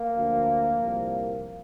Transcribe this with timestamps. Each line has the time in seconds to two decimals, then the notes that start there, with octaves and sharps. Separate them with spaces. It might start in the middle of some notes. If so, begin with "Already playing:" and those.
Already playing: A#3
0.17 D2 D3 F3
0.82 C2 A#2 F3